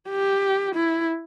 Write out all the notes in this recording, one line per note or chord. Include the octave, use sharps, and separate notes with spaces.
G4
E4